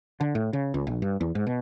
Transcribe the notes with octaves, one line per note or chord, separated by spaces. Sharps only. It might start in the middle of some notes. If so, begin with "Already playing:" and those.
D3
A2
C#3
C#2
A#1
G2
E2
G#2
B2